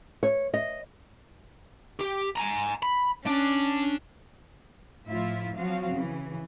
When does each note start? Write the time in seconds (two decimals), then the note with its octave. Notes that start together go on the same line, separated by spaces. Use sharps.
0.23 C#5
0.54 D#5
2.01 G4
2.38 G#5 A#5
2.83 B5
3.26 C#4 D4
5.06 A2 F3 E4 F4 E5
5.56 F3 F#3 C4 F#4 F5
5.93 C#3 E3